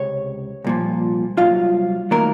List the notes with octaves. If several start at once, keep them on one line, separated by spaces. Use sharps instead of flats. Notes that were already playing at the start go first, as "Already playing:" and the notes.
Already playing: C#2 C3 C#5
C2 A#2 F3
C2 C3 F#3 F4 F5
D#3 F#3 A3 A#3 A#4